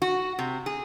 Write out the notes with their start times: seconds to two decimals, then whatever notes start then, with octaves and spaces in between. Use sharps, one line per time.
0.02 F#4
0.39 C3
0.66 G#4